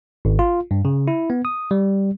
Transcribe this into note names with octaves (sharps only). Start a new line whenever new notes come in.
G#1
F4
G2
C#3
E4
B3
D#6
G3